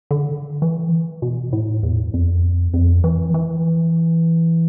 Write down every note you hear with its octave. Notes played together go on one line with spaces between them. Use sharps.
D3
E3
B2
A2
E2
F2
F2
E3
E3